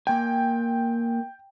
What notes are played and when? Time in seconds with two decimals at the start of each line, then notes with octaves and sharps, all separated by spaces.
0.07 A#3 G5 G#5